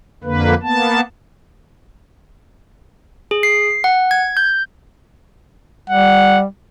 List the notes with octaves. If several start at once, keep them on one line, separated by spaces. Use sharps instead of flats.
F2 D3 A#3 B4
A#3 B3 A5
G#4
C7
F#5
G#6
G6
G3 F#5